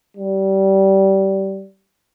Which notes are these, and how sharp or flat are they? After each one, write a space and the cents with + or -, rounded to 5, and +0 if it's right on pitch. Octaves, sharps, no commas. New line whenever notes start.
G3 -20